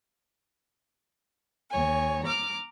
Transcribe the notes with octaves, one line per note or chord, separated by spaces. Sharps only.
D#2 C#5 G#5
A#5 D6 F6